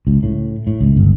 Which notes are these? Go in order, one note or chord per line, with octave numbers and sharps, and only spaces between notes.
C#2
A2
A2
C#2
G1